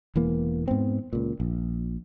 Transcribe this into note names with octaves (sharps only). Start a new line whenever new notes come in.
E1 E3 A#3
G#2 B3 C4
C#2 A#2
A#1